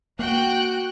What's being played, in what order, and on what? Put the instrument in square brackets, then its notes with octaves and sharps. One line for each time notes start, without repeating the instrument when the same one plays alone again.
[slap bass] A#3 [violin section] F#4 G5 F#6